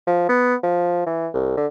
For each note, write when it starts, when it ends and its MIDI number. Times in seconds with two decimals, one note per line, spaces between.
0.07 0.24 53
0.29 0.55 59
0.63 1.06 53
1.06 1.28 52
1.34 1.55 36
1.57 1.67 50